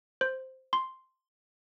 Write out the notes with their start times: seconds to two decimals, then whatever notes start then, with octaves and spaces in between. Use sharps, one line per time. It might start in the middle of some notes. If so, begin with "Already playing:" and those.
0.21 C5
0.73 C6